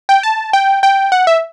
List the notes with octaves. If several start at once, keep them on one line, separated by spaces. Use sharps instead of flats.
G5
A5
G5
G5
F#5
E5